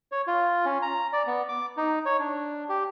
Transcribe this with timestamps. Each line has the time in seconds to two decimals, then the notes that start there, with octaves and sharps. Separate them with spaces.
0.12 C#5
0.27 F4
0.65 C#4
0.82 A#5
1.13 D5
1.27 B3
1.49 D6
1.77 D#4
2.06 C#5
2.19 D4
2.69 G4